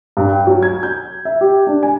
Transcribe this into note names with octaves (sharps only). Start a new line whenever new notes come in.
G2
G5
F#3
G#6
G6
E5
G4
D4
G#5